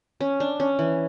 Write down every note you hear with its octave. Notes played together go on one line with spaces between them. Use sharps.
C#4
D4
C#4
E3